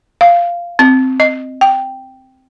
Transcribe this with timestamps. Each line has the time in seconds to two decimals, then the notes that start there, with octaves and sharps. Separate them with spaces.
0.21 F5
0.79 C4
1.20 D#5
1.61 G5